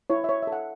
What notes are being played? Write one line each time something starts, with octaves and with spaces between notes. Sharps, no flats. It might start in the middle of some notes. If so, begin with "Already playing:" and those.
E4 C#5
C#5 E5
A4 E5
F#5